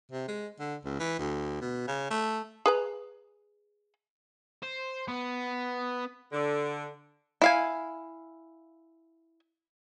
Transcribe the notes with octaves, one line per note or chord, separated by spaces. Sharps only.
C3
G#3
D3
C#2
E3
D2
B2
C#3
A3
G#4 B4 A#5
C5
B3
D3
E4 F5 G#5